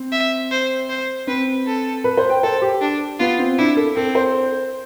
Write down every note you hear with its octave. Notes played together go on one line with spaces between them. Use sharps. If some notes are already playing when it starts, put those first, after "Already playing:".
Already playing: C4
E5
C5
C5
C4 B4
A4
B4
C5
G5
A4 C5
G4
D4
B3 F4
C4
D4 E4
A4
C4 A4
C5